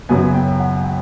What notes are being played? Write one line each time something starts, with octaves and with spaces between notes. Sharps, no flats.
F#1 F#2 C#3 F#3 B3 G#5
G5
F#5
F#5